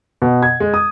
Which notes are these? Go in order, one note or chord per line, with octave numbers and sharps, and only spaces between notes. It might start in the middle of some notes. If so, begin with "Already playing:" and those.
B2
G#6
G#3
D#6